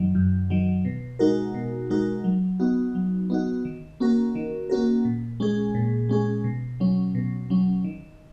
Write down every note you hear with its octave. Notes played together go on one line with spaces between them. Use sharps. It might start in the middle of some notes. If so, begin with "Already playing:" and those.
Already playing: F#2 D#3 F#3
F#2
D#3 F#3
B2
G#3 D#4 F#4 A#4
B2
G#3 D#4 F#4 A#4
F#3
B3 D#4 F#4
F#3
B3 D#4 F#4
D#3
A#3 C#4 F#4 A#4
D#3
A#3 C#4 F#4 A#4
A#2
G#3 C#4 G#4
A#2
G#3 C#4 G#4
B2
F#3 C#4
B2
F#3 C#4
D#3